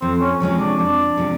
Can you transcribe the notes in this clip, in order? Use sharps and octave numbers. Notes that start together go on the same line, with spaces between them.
F2 C4
C#4
C3 F3 G#3 C4 C#4
D4
F2 D4
C3 F3 G#3 C4